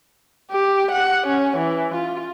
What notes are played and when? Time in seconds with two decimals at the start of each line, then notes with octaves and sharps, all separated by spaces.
0.52 G4
0.92 F#5
1.28 C#4
1.58 E3
1.96 F4